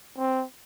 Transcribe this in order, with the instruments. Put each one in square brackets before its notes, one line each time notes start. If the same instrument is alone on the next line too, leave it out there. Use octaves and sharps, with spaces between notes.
[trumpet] C4